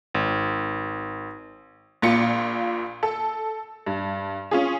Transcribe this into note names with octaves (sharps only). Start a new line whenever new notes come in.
G#1
A#1 A#2 F4 C#7
A4
G2
C#4 F4 G#4